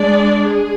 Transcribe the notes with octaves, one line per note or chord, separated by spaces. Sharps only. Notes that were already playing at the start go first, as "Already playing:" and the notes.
Already playing: G#3 D4 D5
G#4